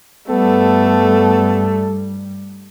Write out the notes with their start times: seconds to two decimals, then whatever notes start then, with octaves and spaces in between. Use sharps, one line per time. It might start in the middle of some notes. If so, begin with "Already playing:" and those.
0.30 G2 G3 A3 B3 A4